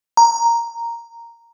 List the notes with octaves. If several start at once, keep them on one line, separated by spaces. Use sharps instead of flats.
A#5